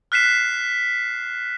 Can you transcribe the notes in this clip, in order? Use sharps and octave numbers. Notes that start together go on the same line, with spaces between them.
F6 F#6 B6 C7 E7